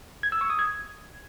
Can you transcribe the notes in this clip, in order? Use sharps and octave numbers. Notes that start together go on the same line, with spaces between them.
G#6
E6
C#6
D#6
G#6